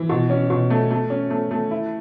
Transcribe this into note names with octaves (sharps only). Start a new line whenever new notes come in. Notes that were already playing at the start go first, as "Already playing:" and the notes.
Already playing: E3
B2
C#4
B2
A3
A3
C#4
A3
A3
E4